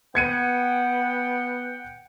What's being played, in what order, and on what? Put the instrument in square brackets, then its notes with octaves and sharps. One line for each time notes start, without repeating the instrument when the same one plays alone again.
[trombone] B3 [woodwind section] F#5 G5 [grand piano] G#6 C#7 D#7